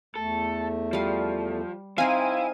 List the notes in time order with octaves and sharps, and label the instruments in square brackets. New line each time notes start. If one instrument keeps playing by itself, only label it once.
[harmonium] E2 A3 [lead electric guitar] A4
[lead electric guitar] F3 [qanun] G3 F5
[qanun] C4 D#4 [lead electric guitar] E4 [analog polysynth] F5 G#5 D#7